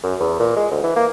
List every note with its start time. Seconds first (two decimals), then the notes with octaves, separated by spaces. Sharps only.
0.03 F#2
0.20 E2
0.40 A#2
0.57 G#3
0.71 D2
0.83 E3
0.96 A#3